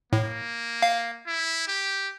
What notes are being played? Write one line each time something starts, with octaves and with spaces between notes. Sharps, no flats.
A2 A#3
F5
E4
G4